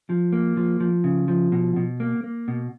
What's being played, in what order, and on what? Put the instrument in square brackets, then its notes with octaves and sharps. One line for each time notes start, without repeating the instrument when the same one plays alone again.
[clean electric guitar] F3
A#3
F3
F3
C#3
F3
B2
B2
A#3
A#3
B2